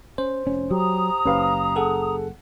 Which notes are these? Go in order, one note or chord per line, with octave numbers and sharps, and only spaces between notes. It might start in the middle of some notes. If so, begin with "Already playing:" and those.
C#4 C5
F1 C#4
F#3 G4 A#5 D#6
F#1 C#4 G4 B4 F5
G#4 A4 F#5